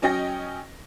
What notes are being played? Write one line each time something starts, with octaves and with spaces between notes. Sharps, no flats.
F#3 C#4 D#5 G5 A#6